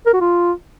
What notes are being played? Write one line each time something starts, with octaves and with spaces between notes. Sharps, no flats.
A#4
F#4
F4